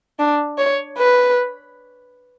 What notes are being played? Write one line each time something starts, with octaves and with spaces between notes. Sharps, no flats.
D4
C#5
B4